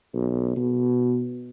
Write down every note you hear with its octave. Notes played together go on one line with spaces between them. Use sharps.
B1
B2